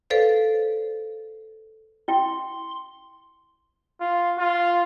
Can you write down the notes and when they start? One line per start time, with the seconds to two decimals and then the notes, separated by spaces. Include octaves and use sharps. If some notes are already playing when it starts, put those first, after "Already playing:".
0.10 A4 B4 C5 D5 F5
2.08 E4 G5 C6
4.01 F4
4.38 F4